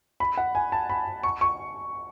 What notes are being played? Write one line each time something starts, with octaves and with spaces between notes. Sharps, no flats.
B5
F#5
G#5
A5
B5
C#6
C#6